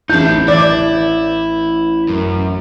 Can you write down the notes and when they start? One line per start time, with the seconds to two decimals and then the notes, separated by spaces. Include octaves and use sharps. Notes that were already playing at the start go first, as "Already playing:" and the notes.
0.10 A1 D#4 E4 A5 G6
0.48 E3 E4 D5
2.08 F#2